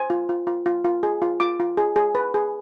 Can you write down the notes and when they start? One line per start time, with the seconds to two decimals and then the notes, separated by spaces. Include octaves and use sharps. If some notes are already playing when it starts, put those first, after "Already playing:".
Already playing: C5 G#5
0.10 F4
0.29 F4
0.47 F4
0.66 F4
0.85 F4
1.03 G#4
1.22 F4
1.40 F4 D6
1.60 F4
1.77 G#4
1.96 G#4
2.15 B4
2.34 G#4